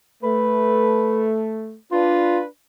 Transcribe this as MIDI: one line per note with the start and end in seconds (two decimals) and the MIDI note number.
0.23 1.78 57
0.23 1.27 71
1.91 2.46 62
1.91 2.38 65
1.91 2.46 71